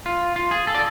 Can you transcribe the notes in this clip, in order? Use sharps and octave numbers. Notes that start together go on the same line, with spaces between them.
F4
F4
G#4
A4
D5